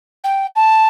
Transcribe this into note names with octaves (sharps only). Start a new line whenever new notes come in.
G5
A5